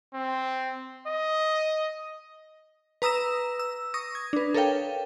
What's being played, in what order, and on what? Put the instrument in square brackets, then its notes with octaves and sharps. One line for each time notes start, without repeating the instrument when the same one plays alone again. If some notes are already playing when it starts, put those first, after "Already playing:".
[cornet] C4
D#5
[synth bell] B4 A#5 D#6 E6 A#6 E7
E6
C#6 D#6 A#6
G#6
D4 B4
A4 A#4 C#5 F5 G5